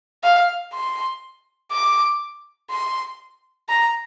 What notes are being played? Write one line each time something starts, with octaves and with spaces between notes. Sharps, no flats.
F5
C6
D6
C6
A#5